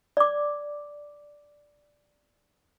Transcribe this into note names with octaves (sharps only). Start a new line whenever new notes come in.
D5 D6